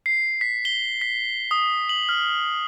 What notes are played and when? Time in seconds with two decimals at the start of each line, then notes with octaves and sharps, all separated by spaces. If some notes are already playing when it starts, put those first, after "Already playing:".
0.06 C7
0.41 B6
0.65 G7
1.01 B6
1.51 D#6
1.89 F#7
2.09 F6